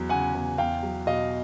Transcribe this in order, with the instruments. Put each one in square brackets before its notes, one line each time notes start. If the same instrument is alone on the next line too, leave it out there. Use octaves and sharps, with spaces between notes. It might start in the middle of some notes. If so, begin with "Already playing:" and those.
Already playing: [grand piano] E2 F#3
C#3 F#5 G#5
E2
E2 F5 G5
F#3
B2 D#5 F5